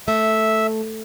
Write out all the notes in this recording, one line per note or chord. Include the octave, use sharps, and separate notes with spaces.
A3 E5